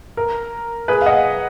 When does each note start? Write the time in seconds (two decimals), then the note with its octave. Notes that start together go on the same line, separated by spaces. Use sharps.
0.17 A#4
0.88 G#4 B4
1.01 F5
1.06 D#5 F#5